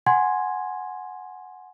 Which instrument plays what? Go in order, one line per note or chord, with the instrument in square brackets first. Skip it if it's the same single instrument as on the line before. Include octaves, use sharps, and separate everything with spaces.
[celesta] F#5 G#5 C6 G#6